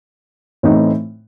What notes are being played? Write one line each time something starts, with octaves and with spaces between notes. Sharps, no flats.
A2 E3 A3 C4 D#4